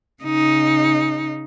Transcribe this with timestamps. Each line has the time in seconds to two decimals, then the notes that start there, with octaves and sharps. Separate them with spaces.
0.23 C#3 D#4